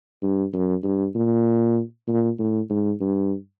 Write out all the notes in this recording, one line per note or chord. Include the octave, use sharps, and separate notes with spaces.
G2
F#2
G2
A#2
A#2
A2
G#2
G2